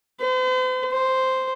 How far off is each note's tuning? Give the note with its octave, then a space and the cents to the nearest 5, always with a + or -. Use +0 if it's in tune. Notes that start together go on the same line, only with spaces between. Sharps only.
C5 -45
C5 -5